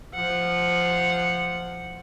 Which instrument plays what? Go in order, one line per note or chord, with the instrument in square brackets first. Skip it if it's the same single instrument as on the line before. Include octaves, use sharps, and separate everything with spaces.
[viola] F3 F#5